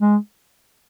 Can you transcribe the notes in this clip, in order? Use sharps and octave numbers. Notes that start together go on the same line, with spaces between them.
G#3